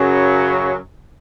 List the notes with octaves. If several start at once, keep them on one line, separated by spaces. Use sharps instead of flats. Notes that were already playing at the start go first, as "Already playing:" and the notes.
Already playing: F#2 C#3 F#3